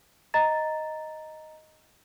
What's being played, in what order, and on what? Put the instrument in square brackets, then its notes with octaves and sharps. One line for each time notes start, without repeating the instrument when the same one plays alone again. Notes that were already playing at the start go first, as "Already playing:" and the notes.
[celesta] D#5 A#5 A6